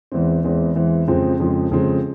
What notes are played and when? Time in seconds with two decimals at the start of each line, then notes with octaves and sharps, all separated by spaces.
0.12 E2 E3 G#3 C4
0.44 E2 E3 G#3 C4
0.75 E2 E3 G#3 C4
1.07 F2 C#3 F3 G#3 C4
1.40 F2 C#3 F3 G#3 C4
1.71 F2 C#3 F3 G#3 C4